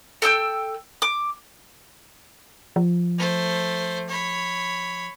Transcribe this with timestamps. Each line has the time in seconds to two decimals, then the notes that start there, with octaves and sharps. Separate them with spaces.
0.22 A4 G5 E6 G6
1.02 D6
2.76 F3
3.18 A3 C5
4.09 C#5 B5